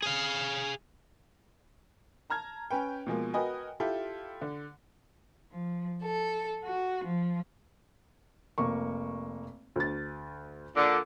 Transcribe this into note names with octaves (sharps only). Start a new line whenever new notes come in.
G#4 F5
A5 A#5 F6 G#6
C#4 B4 G5
B2 F3 G#3 A#3
F#4 A#4 B4 D#5 G5 G#5
E4 F4 G4 A4
D3
F3
A4
F#4
F3
F1 A#3 C#6
D2 A6
A#2 D3